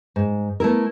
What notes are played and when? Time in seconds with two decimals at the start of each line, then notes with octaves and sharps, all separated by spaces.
0.16 G#2
0.60 A3 B3 E4 A#4